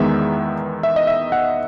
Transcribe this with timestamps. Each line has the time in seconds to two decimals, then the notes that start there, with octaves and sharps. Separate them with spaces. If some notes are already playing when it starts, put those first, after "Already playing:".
Already playing: E2 D#3 G#3 B3 E5
0.83 E5
0.96 D#5
1.07 E5
1.32 F#5